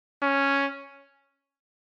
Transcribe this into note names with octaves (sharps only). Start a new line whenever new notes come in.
C#4